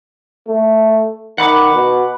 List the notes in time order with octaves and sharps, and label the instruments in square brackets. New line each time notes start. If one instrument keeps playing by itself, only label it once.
[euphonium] A3
[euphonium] D#3 [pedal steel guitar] F#5 B5 D6
[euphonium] B2